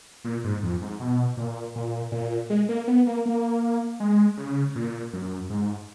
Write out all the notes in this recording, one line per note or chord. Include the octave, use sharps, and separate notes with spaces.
A#2
G#2
F2
G#2
B2
A#2
A#2
A#2
G#3
A#3
B3
A#3
A#3
G#3
C#3
A#2
F#2
G#2